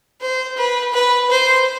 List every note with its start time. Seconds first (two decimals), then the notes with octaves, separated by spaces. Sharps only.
0.22 C5
0.58 B4
0.93 B4
1.30 C5